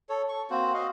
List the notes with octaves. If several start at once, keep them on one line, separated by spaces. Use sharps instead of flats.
A4 C#5
C#6
A#3 C4 F#4 C5
F#4 D#5 F5